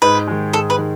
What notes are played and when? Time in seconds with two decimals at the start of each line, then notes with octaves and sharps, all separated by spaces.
0.02 G#2 B4
0.27 D#3 G#3
0.53 G#2 A4
0.70 B4
0.78 D#3